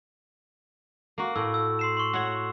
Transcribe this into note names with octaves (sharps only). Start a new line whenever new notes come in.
A#3 F#4
A2 E6
E6
C6 C7 E7
C6 C#6
F#4 C#5 F#5